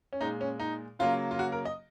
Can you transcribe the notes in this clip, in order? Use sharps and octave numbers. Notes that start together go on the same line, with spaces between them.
C#4
A#2 G#3 D#4
C#4
D#4
C#3 F#3 A#3 F4
F4
F#4
A#4
D#5